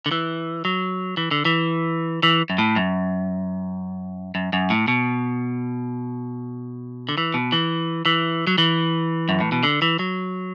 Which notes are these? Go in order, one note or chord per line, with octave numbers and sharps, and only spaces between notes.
D3
E3
F#3
E3
D3
E3
E3
F#2
A2
F#2
F#2
F#2
A2
B2
D3
E3
B2
E3
E3
F#3
E3
F#2
A2
B2
D3
E3
F#3